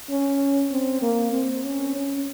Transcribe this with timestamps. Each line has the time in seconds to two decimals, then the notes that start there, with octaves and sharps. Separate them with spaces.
0.10 C#4
0.72 C4
1.02 A#3
1.33 C4
1.64 C#4
1.95 C#4